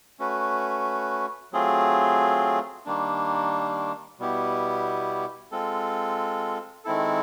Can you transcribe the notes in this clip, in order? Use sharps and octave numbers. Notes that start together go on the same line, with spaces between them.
A3 C#4 F#4 B4
F#3 A3 C4 F4 G#4
D#3 G3 A#3 D4
B2 G3 B3 E4 G4
G#3 C4 F4 A4
D#3 G#3 C4 E4 A4